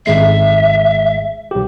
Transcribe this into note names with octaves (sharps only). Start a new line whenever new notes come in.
G#1 G#3 E5 C7
B1 G4